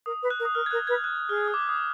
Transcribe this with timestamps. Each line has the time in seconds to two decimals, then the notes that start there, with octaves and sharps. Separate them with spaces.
0.06 A#4 D#6
0.22 B4
0.30 F#6
0.39 A#4
0.45 D#6
0.55 A#4 F6
0.66 G#6
0.71 A#4 F#6
0.87 B4 G#6
1.04 F#6
1.29 G#4 F6
1.48 D#6
1.54 D6
1.69 D#6